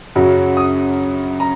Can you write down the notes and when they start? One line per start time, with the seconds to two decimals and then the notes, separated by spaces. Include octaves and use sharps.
0.15 F#2 C#3 F#3
0.57 D#6
1.40 A#5